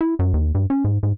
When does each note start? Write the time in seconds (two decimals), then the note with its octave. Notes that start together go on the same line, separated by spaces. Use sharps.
0.01 E4
0.19 F#2
0.34 D#2
0.55 G2
0.70 C#4
0.84 G#2
1.03 G#2